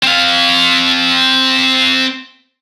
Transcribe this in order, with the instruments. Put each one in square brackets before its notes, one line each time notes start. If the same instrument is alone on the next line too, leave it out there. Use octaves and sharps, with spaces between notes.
[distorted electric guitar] C4 F5